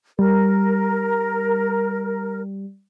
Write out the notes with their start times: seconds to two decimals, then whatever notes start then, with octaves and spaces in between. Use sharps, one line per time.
0.19 G3 A#4